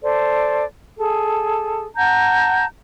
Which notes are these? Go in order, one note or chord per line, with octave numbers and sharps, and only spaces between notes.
A4 C5 D5
G#4 A4
F#5 A5 A#5 G6